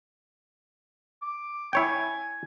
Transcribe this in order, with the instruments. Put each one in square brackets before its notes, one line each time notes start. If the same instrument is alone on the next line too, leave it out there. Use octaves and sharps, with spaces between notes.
[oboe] D6
[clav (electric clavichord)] E4 C#5 G5 [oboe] G#5